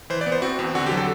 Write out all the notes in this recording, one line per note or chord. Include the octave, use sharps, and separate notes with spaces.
E3 C5
D5
B3
C5
C4 F#4
E2
D3 F#4
G4
F#3
A4